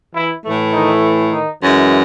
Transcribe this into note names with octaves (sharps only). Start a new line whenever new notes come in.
E3 E4
A2 E3 A3
D#3 D#4
D#3 D#4
F#2 E3 G#3